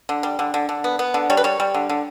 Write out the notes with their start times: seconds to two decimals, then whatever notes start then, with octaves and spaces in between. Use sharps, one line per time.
0.09 D3
0.23 G3
0.39 D3
0.54 D3
0.69 D3
0.84 B3
0.99 B3
1.14 D3
1.30 G3 C#5
1.37 B4
1.44 G3 C#5
1.60 G3
1.74 D3
1.89 D3